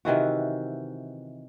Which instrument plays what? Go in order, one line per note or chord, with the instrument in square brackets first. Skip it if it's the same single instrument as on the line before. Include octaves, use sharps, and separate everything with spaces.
[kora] C3 D#3 E3 F#4